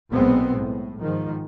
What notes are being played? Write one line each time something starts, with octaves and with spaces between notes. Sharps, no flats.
B1 A#2 G#3 B3 C4
A2
G#2 D#3 F3